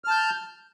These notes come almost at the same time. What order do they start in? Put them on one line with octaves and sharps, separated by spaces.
F6 A5 G6